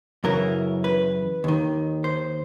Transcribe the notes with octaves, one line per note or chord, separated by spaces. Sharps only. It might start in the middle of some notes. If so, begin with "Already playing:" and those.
F#2 C#3 E3 A#4
B4
D#2 D#3
C5